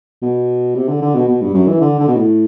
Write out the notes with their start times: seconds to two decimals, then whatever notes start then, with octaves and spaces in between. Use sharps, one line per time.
0.22 B2
0.75 C3
0.88 D3
1.02 D3
1.15 B2
1.28 B2
1.42 G2
1.54 F#2
1.68 E3
1.81 D3
1.99 D3
2.08 B2
2.16 A2